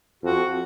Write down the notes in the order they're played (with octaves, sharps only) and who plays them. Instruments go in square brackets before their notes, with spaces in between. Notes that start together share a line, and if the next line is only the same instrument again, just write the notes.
[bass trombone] F2 [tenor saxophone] F#4